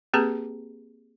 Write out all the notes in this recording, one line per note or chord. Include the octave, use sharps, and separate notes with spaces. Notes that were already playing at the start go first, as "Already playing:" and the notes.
A#3 C4 G4 G#4 B4 A#5